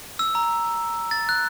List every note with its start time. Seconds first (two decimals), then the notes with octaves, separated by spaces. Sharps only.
0.19 E6
0.35 A#5
1.11 A6
1.29 F#6